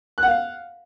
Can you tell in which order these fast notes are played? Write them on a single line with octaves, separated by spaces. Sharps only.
F#6 F#5 F5